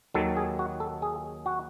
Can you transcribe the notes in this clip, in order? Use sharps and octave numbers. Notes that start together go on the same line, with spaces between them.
D#2 D#3 F#3 A4
G#4
F#4
A4
G#4
F#4